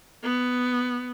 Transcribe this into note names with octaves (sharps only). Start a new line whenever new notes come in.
B3